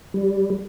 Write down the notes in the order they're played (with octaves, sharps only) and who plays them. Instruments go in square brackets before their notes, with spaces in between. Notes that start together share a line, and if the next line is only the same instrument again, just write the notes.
[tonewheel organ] G3